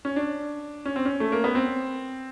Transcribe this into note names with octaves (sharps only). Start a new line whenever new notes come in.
C#4
D4
C#4
C4
C#4
A3
A#3
B3
C4